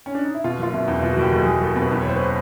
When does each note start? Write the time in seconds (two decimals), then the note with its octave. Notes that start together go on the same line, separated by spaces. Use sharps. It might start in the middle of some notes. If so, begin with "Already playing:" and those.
0.06 C#4
0.15 D4
0.25 D#4
0.34 E4
0.44 B2 F4
0.59 F#1 F4
0.73 B2 E4
0.88 E2
1.02 B2 F4
1.13 F#1 F#4
1.22 G4
1.32 F#1
1.42 G#4
1.47 F#1
1.61 F#1 A4
1.76 B2
1.81 B4
1.91 E2
2.01 C#5
2.05 F#1 C5
2.16 B4
2.23 C5